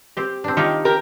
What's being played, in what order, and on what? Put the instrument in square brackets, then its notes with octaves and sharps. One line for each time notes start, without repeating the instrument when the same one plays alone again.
[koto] C4 G4
C4 D4
[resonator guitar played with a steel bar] D#3 [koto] F4 G4 E5
[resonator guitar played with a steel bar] G4 A#4